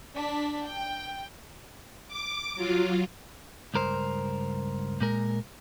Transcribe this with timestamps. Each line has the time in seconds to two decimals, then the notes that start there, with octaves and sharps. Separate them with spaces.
0.16 D4 B6
0.66 G5
2.08 D6
2.55 F#3 F4
3.74 C#2 G2 A#4 C5
5.01 A#2 G#3 A#4